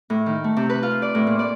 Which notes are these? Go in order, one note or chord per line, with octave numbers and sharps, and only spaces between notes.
A2
D#3
A3
C3
B4
F4
D5
A2
A#2
D5